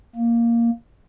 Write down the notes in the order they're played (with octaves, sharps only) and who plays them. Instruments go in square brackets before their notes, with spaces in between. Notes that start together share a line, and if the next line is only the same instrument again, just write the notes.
[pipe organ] A#3